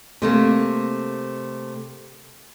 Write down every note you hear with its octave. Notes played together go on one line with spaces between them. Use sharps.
C3 A3 A#3